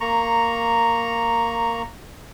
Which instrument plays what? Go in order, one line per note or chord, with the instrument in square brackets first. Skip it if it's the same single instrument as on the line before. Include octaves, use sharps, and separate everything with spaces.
[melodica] A#3 A#5 C#6